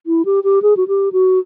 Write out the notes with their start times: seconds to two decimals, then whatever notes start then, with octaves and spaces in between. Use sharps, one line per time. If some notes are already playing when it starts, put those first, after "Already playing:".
0.07 E4
0.25 G4
0.44 G4
0.62 G#4
0.77 F#4
0.88 G4
1.12 F#4